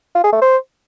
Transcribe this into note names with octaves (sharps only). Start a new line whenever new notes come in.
F4
G#4
A3
C5